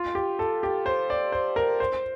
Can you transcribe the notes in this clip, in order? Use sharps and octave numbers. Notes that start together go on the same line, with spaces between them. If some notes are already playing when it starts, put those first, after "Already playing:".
Already playing: F4
G4
A4
G4
C5
D5
C5
A#4
C5